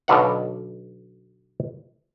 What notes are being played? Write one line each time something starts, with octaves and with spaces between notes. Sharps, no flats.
B1 B2 D3 F#3 F5 F#5